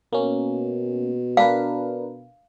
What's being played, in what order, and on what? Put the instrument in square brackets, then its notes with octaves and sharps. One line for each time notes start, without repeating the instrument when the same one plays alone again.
[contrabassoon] B2 [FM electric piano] A#3 C#4
[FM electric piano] D4 A#4 B4 [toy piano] F5